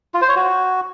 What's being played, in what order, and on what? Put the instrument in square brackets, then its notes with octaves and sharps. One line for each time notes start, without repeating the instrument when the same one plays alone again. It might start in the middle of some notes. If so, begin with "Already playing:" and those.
[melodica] F4
C5
C#5
F#4